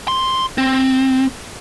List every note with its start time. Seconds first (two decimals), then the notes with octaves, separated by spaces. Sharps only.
0.08 C6
0.58 C4